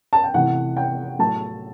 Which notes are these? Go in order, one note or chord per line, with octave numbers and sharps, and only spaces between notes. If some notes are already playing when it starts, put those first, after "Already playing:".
A5
G5
C3 E3 A3 E4 F#5
G5
A2 F#3 A3 A5